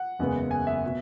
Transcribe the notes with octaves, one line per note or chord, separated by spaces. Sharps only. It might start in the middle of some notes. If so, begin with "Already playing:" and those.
Already playing: F#5
F#1 E2 C#3 G#3 B3
G#5
E5
B2